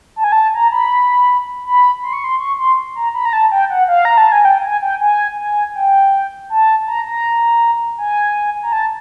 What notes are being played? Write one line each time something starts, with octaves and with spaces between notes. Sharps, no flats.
A5
G#5
A5
A#5
B5
B5
C6
C#6
C6
C#6
C6
A#5
B5
A#5
A5
G5
F#5
F5
A#5
A5
G#5
G5
G#5
G5
G#5
G#5
G5
A5
A#5
A#5
G#5
A#5
A5